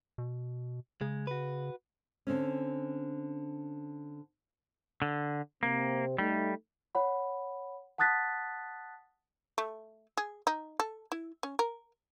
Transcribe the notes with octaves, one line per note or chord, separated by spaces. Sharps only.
B2
C#3 G#3
F#4 B4
D3 C4 C#4
D3
C3 A#3 C4
G3 A3 D#4
C#5 F#5 B5
F#5 A5 D#6 F#6 A6 B6
A3
G#4
D#4
A4
E4
C#4
A#4